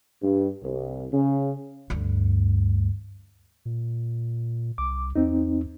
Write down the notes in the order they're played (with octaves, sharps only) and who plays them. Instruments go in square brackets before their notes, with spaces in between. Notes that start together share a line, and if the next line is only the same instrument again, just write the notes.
[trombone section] G2
C2
C#3
[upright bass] D2 G2
[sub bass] A#2
[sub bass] C2 [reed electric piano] D6
[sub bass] E2 [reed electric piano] C4 D#4